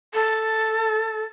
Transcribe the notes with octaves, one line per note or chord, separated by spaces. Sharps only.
A4